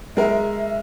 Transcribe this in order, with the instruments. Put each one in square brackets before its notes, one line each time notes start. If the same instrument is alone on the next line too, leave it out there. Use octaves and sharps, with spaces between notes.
[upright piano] G#3 A#4 [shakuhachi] E5